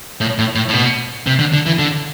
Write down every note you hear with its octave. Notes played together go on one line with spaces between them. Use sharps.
A2
A2
A2
A2
B2
C3
D3
D3
E3
D3